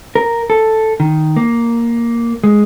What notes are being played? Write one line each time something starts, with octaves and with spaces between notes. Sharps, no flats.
A#4
A4
D#3
A#3
G#3